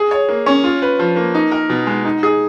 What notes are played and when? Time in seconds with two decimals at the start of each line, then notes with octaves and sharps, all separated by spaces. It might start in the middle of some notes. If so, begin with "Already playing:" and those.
Already playing: G#4
0.11 C#5
0.29 A#3
0.46 C#4
0.64 F4
0.82 B4
0.99 F3
1.16 A#3
1.35 D#4
1.52 A#4
1.70 B2
1.87 G#3
2.05 D#4
2.23 G#4